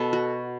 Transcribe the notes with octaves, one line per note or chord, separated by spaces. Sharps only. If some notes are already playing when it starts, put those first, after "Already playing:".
Already playing: B2 A4 B4
F#4